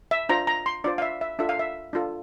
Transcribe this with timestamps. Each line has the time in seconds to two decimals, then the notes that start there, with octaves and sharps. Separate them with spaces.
0.11 E5
0.29 D4 F4 C5 A#5
0.47 A#5
0.66 C6
0.84 D4 F4 C5 D5
0.98 F5
1.02 E5
1.21 E5
1.39 D4 F4 A4 E5
1.49 F5
1.59 E5
1.93 D4 F4 A4